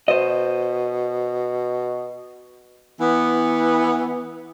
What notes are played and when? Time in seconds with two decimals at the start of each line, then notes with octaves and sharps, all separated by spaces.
0.08 B2 C5 D#5
3.01 E3 B3